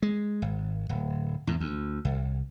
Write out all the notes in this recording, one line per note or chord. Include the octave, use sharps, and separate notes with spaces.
G#3
G#1
D1
E2 G#2
D2
C2